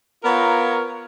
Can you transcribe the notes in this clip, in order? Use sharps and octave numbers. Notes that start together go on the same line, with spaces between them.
B3 F4 A#4 C#5 A#5